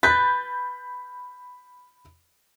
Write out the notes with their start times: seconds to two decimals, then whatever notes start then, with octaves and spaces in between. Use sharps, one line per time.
0.03 B4 B5 G6 A6